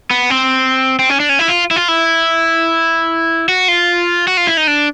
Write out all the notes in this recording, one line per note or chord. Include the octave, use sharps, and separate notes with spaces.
B3
C4
C4
C#4
D4
C#4
E4
F4
E4
F4
E4
F#4
F4
F#4
F4
E4
D#4
D4